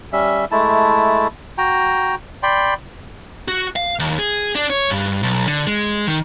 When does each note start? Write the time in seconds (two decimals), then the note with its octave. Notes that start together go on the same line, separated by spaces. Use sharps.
0.13 G3 C#4 E5
0.51 G#3 A3 E4 A5
1.58 F#4 G5 A#5
2.43 D5 G5 B5 C6
3.48 F#4
3.76 F5
3.99 D#2
4.19 G#4
4.55 D4
4.70 C#5
4.90 G2
5.23 B1
5.47 D3
5.67 G#3
6.08 D#3